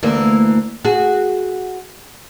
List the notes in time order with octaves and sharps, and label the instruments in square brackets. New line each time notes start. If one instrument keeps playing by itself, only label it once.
[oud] D2 E3 A#3
F#4 G#4